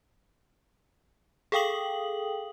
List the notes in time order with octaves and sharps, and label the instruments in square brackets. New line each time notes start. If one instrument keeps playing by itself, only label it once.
[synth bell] G#4 A4 F5 G5 D#6 F#7